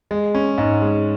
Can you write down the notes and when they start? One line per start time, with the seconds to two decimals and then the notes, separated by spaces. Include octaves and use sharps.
0.11 G#3
0.35 C#4
0.58 G#2
0.82 G#3